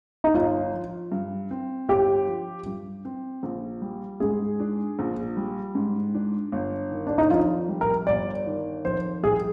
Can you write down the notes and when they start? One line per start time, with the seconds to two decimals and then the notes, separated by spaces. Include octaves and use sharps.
0.24 D#4
0.34 G1 F4
0.73 F3
1.12 G2
1.51 C4
1.89 G1 G4
2.27 F3
2.66 G2
3.05 C4
3.43 A#1
3.82 G3
4.20 G#2 G#4
4.60 D4
4.99 A#1
5.37 G3
5.75 G#2
6.15 D4
6.52 G1
6.91 D#3
7.07 D4
7.18 D#4
7.30 F2 F4
7.69 G3
7.81 A#4
8.07 G1 D5
8.46 D#3
8.85 F2 C5
9.23 G3 G#4